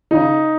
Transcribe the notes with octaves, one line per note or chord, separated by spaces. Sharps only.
C#3 D#4